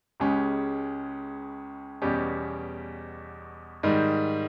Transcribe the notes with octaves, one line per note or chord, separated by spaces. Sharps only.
C#2 C#3 G#3 C#4 G4
E2 B2 G3 C#4 G4
G#2 D#3 G3